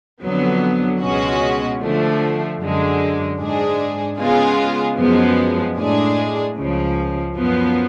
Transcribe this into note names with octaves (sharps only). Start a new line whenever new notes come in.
F2 D3 F#3 B3
C#2 B2 G#3 C#4 F#4
D3 F3 A3
F#2 D3 G#3
G#2 G#3 D4 G#4
C#3 G#3 B3 F4 G#4
F#2 F3 G#3 B3
A2 G#3 D4 G#4
C#2 C#3 F3
F#2 F3 B3